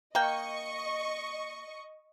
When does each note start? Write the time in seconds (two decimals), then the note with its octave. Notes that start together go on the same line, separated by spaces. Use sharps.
0.15 A#3 D#5 G5 C#6